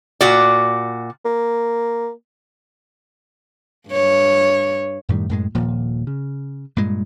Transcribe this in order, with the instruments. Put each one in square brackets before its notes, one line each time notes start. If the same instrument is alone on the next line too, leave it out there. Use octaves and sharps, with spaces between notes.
[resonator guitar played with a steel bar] A#2 F#4 D5
[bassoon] A#3
[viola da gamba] G2 C#5
[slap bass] F#2 A2 D#3 G3
F#2 A2 G#3
D#1 A#2 F3
C#3
G2 A#2 G#3